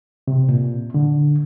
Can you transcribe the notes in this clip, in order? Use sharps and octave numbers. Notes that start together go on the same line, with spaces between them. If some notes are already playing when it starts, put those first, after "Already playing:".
C3
A#2
D3